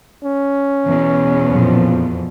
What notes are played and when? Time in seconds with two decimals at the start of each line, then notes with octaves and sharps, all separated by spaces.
0.24 C#4
0.84 E2 B2
1.48 F2 A#2 F3